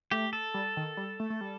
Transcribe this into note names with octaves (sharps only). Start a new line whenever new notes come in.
A3 G4
A4
G3
D#3
G3
A3
A3
G3